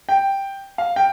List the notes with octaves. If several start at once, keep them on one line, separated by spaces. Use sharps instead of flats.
G5
F5
G5